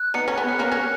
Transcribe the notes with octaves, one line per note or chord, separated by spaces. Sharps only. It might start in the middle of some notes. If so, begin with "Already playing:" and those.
Already playing: F#6
B3 D#4 C#7
C#4
B3
F#6
A#3 C#4
C#4